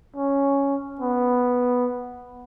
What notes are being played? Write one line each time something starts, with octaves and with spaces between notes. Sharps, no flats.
C#4
B3